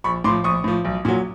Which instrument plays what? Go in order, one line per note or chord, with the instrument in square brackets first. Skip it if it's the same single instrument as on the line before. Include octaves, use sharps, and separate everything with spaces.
[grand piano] A#1 B5 C#6
A2 C6 D6
F3
A#1 C#6 D#6
A2 F3
B1
A#2 F#3